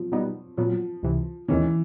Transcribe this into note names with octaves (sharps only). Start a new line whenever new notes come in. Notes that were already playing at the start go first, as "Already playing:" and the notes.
Already playing: F3 F#3
B2 G3 B3 D#4
A#2 F3 F#3 B3
C#2 C3 E3
D#2 D#3 E3 G#3 C#4